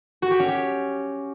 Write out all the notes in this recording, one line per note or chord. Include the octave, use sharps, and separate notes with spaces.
F#4
G4
C#4
G4